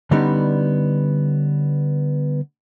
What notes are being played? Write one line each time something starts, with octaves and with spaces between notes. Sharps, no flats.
D3 G3 B3 C#4 D#4